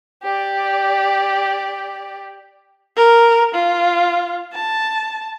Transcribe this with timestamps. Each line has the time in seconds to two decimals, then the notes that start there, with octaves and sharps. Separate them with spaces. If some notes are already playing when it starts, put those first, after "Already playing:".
0.23 G4 D5
2.97 A#4
3.54 F4
4.54 A5